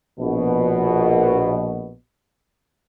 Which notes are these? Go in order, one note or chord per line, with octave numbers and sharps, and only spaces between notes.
A#1 B2